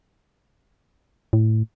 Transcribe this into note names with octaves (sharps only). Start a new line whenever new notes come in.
A2